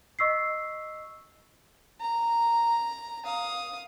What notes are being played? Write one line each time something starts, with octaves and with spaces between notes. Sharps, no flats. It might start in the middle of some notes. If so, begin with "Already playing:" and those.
D#5 C#6 E6 B6 C7
A#5
F5 D#6